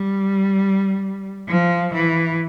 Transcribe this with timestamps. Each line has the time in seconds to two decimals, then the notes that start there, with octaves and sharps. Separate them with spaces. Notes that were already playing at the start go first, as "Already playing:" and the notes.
Already playing: G3
1.48 F3
1.94 E3